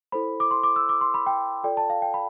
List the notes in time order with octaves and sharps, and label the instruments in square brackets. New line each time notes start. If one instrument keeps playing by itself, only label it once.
[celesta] E4 A4 C5 B5
D6
C6
D6
E6
D6
C6
B5
G5
F4 A4 D5 G5
A5
F5
G5
B5